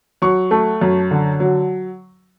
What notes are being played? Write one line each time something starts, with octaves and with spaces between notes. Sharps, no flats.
F#3 C#6
A3
F#2
D3
F#3